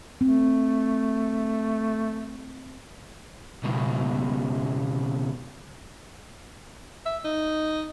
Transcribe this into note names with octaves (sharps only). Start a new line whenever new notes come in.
A3 C4
C#2 B2
E5
D#4